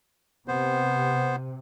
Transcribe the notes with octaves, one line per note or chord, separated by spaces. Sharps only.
C3 B3 C5